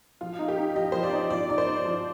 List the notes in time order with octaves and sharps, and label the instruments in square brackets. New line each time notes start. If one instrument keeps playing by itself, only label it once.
[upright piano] F3 [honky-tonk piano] F4
[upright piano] D#4
[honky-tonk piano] G4
[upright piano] D#4
[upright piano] F3 [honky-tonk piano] D#5
[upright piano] F3 [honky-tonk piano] C5
[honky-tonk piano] D5
[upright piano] D#4
[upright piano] F3 [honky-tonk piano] D5
[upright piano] D#4 [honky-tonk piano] D5
[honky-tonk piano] C5
[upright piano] D#4
F3